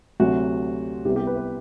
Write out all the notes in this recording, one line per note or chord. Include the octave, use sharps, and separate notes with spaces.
D2 C3 F#3 F#4
C2 C3 G3 B3 G4
G4
B4
B4